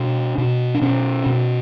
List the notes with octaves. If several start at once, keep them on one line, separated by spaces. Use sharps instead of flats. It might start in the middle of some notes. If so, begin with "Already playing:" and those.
Already playing: B2 D4
B2
D4
B2 C#4
B2